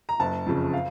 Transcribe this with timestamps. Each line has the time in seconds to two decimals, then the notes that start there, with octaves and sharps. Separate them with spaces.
0.09 A#5
0.20 F#1 A5
0.46 F2 C#3
0.73 F5